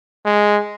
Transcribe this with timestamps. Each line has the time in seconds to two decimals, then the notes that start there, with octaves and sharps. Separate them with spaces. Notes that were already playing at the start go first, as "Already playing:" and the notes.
0.25 G#3